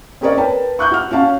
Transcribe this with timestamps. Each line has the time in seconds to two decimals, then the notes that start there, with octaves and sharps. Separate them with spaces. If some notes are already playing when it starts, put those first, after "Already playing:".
0.21 C4 C#4 G#4 A#4 C#5 D5
0.38 A#4 B4 G5 A5
0.79 C#6 F#6 G6
0.92 F#4 F6
1.11 C#4 F#4 F5 A5